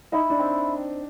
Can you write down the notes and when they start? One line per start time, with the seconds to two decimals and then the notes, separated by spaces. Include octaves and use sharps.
0.12 D#4 E4
0.30 D4
0.39 C4